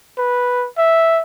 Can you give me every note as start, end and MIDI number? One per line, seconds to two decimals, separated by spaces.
0.18 0.68 71
0.78 1.23 76